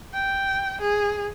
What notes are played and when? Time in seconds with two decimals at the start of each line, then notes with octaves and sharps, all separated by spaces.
0.13 G5
0.81 G#4